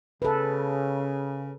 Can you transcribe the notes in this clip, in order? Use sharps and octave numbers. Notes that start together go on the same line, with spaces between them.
C#3 A4 B4